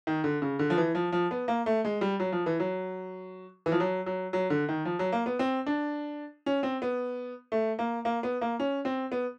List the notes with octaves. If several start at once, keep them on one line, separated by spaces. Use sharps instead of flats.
D#3
D3
C#3
D3
F3
E3
F3
F3
B3
A#3
A3
G#3
G3
F#3
F3
E3
F#3
E3
F3
F#3
F#3
F#3
D3
D#3
F3
F#3
A#3
B3
C4
D4
C#4
C4
B3
A3
A#3
A#3
B3
A#3
C#4
C4
B3